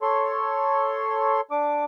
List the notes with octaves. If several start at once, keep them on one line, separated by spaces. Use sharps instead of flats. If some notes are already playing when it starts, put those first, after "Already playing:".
A4 C#5 C6
D4 D6